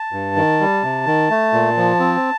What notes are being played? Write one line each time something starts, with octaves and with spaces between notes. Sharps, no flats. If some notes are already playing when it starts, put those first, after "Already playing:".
Already playing: A5
G2
D#3
G3
C3
D#3
A3
A#2
F3
C4